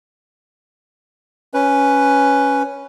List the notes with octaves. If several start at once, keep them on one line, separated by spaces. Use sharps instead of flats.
C#4 B4